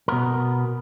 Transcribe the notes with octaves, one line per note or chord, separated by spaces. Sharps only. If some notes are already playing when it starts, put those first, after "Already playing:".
B2 B3 A#4